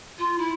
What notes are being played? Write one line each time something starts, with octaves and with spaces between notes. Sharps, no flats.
F4
E4